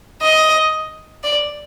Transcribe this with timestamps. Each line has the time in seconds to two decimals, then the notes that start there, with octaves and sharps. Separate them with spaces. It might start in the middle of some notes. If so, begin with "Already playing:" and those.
0.22 D#5
1.24 D5